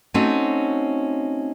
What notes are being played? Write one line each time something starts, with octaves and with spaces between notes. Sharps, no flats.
A3 C4 C#4 D#4 F#4